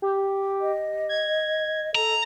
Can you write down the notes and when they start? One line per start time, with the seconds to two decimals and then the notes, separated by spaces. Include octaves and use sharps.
0.02 G4
0.61 D#5
1.09 G#6
1.95 A4 A#5